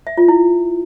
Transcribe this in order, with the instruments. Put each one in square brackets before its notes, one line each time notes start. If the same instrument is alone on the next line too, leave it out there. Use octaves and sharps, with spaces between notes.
[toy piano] E5
F4
E4